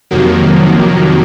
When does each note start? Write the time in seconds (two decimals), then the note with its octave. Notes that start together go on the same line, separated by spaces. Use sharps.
0.11 F2 C3 D#3 F#3 A#3